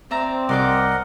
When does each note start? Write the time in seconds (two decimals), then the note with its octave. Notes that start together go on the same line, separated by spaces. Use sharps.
0.11 C4 D5 E5 A#5
0.49 C2 A#4 D5 D#5 F#5 C6 D6